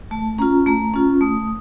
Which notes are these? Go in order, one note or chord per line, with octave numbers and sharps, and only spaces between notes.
A3 A5
C#4 F4 A#5
A3 A#5
C#4 F4
A3 D#6